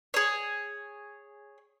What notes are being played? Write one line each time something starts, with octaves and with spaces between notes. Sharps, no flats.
G#4 C#5